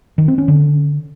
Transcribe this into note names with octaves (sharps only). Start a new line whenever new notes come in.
D#3
C4
C#4
D3